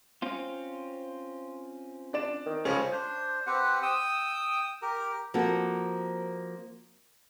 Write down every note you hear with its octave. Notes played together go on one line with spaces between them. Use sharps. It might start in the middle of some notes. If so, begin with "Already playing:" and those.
C4 C#4 F4
D4 D5 E7
D#3
C#2 F3 C#4 G#4 A4 C#5
D4 C5
C4 G4 B4 F#5
G5 D#6 E6
G4 A#4
F3 A#3 C4 F#4 A4